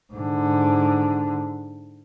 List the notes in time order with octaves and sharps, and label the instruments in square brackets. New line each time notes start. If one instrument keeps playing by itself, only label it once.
[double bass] G#2 D3